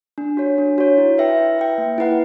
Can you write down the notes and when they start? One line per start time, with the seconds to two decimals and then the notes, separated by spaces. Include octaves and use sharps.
0.18 D4
0.37 F#4 C#5
0.58 D4
0.78 F#4 C#5
0.98 E4
1.18 B4 E5 G5
1.38 E4
1.58 B4 E5 G5
1.78 A#3
1.98 E4 B4 F#5